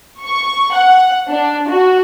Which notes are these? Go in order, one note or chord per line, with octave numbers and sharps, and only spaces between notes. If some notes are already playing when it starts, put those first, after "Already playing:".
C#6
F#5
D4
F#4